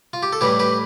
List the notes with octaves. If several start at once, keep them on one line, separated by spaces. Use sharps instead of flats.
F4
G4
A4
A2 E3 G3 G4 B4
G4 B4